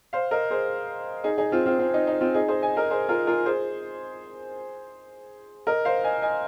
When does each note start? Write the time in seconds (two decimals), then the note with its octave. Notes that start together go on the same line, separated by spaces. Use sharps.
0.13 C5 F5
0.31 A#4 D#5
0.50 G#4 C5
1.24 D#4 G#4
1.38 D#4 G#4
1.52 C4 F4
1.66 C4 F4
1.79 C4
1.94 D#4
2.07 D#4
2.21 C4 F4
2.34 D#4 G#4
2.48 G#4 C5
2.62 D#5 G#5
2.76 A#4 D#5
2.91 G#4 C5
3.09 F4 A#4
3.27 F4 A#4
3.46 G#4 C5
5.67 A#4 D#5
5.85 C5 F5
6.04 D#5 G#5
6.22 D#5 G#5